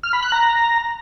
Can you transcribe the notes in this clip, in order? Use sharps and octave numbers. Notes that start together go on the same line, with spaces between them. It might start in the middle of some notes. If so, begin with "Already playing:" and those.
F6
B5
F#6
A#5